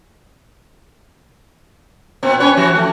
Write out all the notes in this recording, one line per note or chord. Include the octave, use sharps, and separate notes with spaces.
A#2 B3 C4
C#4 B4 C#5
E3 F3 F#4
A3